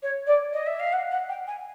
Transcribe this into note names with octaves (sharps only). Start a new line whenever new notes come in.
C#5
D5
D#5
E5
F5
F#5
F#5
G5
G#5